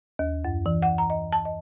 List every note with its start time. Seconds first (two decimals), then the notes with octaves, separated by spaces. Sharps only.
0.19 D#2
0.45 F#2
0.66 E3
0.83 F#5
0.98 A#5
1.10 D#5
1.33 A5
1.45 D#5